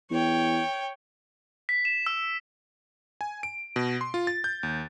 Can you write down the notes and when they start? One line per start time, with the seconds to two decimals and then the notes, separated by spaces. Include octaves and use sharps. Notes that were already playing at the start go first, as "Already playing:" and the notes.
0.11 E2 C#5 G5
1.69 B6
1.85 E7
2.06 E6
3.21 G#5
3.43 D7
3.76 B2
4.01 C6
4.14 F4
4.27 A6
4.44 G6
4.63 D#2